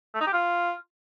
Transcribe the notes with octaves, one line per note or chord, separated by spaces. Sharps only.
A3
D#4
G4
F4